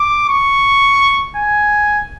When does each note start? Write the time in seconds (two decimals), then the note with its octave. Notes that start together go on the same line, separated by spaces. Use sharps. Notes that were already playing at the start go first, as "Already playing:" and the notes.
Already playing: D6
0.29 C#6
1.37 G#5